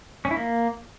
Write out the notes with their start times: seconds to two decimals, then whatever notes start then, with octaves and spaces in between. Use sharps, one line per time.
0.25 C#4
0.31 E4
0.37 A#3